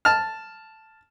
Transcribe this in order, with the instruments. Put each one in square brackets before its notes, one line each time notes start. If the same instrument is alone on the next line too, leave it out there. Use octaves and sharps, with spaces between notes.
[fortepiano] A5 F6